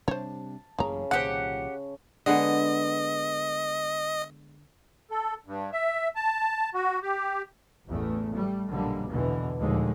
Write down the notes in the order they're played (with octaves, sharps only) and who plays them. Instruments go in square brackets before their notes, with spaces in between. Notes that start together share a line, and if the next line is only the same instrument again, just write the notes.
[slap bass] C3 G3 D4 [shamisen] C5 C#5 [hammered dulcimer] A5
[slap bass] A1 F#2 A#3 [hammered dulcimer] C#3 [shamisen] G#4 A#5
[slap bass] C2 A#2 D#3 [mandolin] G4 F#5 [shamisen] G#4 C5
[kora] D3 G#3 B3 [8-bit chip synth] D#5
[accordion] A4
G2
E5
A5
F#4
G4
[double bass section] A1 E2 A3
G3 A3
A#1 F#2 B2 D3 G3 A#3
E2 B2 D3 E3
D#2 A#2 D3 F3 G#3 A3